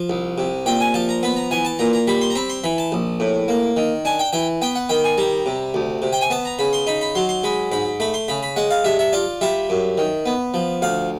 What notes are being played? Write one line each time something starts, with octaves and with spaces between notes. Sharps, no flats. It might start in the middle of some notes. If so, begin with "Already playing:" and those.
Already playing: F3
C2
C3
A#2 G5
G#5
F3 A5
A#5
B3 B5
A#5
E3 G#5
A5
A#2 A#5
A#5
G3 B5
C6
A#5
C4 B5
C6
E3 B5
A5
A#1
A2
A#3
D#3
D4 G#5
G5
E3 G5
B3 G5
F#5
D#3 G5
G#5
G3 A#5
C3
D2
C3
G5
G#5
B3 A5
A#5
C#3 B5
C6
D#4 B5
B5
F#3 C6
C6
G#3 B5
G#2 B5
A3 B5
C6
C#3 B5
B5
G#3 F#5
F5
G2 E5
E5
F4 D5
G3 E5
F#2
D#3
B3
F3
D2 F5